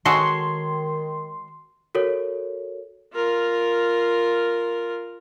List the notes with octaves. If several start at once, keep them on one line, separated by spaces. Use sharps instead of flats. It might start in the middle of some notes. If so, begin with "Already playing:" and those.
D#3 G#3 F#4 A4 C#5 D#5 C6
F#4 A4 A#4 C#5
F4 A#4